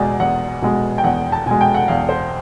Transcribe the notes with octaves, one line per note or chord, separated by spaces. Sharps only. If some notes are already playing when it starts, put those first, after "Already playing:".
Already playing: E2 B2 G#3 D5
E2 F#5
B2 G#3
G5
E2 F#5
A5
B2 G#3 G#5
G5
F#5
E2 F5
C5